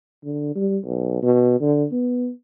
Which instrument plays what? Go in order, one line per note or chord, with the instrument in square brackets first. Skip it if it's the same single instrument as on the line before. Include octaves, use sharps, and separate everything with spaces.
[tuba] D3
G3
B1
B2
D3
B3